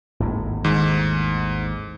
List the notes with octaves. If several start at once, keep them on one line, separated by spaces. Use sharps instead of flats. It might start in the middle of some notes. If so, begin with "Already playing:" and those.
G#1 D#2 A2
G#2 D#3